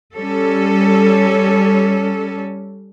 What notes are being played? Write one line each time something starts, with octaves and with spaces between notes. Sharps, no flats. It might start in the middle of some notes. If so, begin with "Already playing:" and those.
G3 C#4 A4